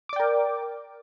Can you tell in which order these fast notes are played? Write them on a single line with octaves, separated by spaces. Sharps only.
D6 D5 G5 A#4